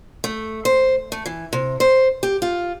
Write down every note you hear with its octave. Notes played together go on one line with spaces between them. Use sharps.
A3
C5
A3
E3
C3
C5
G4
F4